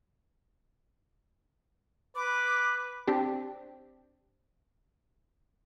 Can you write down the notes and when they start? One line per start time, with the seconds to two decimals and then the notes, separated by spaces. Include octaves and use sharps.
2.15 B4 D6
3.07 C4 D4 G4